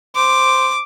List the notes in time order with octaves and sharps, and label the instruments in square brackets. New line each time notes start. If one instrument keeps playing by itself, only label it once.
[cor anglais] C5 [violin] D6